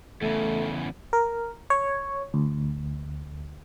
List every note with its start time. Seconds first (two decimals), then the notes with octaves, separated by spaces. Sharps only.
0.22 E2 C#3 A3
1.13 A#4
1.70 C#5
2.34 D2